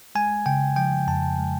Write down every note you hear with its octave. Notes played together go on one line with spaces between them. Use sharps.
G#3 G#5
C#3 G5
F3 G5
F2 A5
G#3